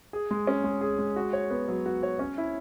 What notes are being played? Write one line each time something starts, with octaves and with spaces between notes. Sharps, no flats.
G#4
G#3
C#4
G#3
G#4
G#3
F#4
C#5
B3
F#3
F#4
C#5
C#4
E4